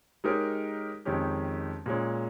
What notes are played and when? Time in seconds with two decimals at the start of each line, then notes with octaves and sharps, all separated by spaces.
0.24 G#3 D#4 G4 A#4 C#5
1.05 F2 D#3 G#3 C#4 G4
1.86 A#2 G#3 C#4